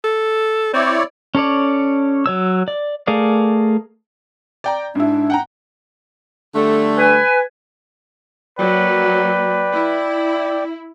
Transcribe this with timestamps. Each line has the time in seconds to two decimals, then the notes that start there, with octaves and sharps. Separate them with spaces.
0.04 A4
0.73 C4 E4 C#5 D5
1.35 C#4 A4 C#5 D5
2.26 F#3 C#5 E6
2.68 D5
3.07 A3 G#4 A#4 D5 F5
4.64 D5 G5 A#5
4.95 G#2 D4 E4
5.30 F#5 G5 A#5
6.55 D3 G3 A3
6.98 B4 G#5
8.58 F#3 A#3 B4 D5 G5
9.72 E4